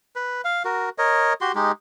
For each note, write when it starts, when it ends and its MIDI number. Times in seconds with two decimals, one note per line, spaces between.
0.16 0.41 71
0.45 0.63 77
0.65 0.89 66
0.65 0.89 70
0.98 1.33 70
0.98 1.33 73
0.98 1.33 75
1.41 1.52 66
1.41 1.52 67
1.41 1.52 84
1.55 1.72 56
1.55 1.72 63
1.55 1.72 67